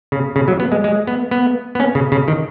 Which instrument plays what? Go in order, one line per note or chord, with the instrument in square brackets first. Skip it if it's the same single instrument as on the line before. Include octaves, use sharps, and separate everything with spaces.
[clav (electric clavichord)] C#3
C#3
F#3
B3
G#3
G#3
B3
B3
B3
C#4
C#3
C#3
D#3